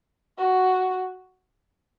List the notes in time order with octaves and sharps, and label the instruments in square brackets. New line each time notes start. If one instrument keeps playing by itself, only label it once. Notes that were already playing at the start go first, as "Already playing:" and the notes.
[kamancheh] F#4